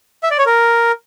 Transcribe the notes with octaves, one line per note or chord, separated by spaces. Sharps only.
E5
D5
C#5
A#4